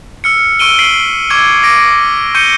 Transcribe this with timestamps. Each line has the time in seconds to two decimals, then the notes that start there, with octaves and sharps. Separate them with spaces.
0.24 E6 F6 C#7
0.59 C#6 E6 D7 D#7 G7
0.79 B6 C7 D7 F#7
1.30 C#6 D6 E6 G#6 G7
1.63 D6 A#6 D7
2.35 C#6 G6 C#7 D#7 G7